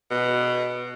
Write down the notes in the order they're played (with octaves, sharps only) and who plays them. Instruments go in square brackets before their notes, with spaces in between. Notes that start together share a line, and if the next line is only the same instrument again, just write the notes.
[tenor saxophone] B2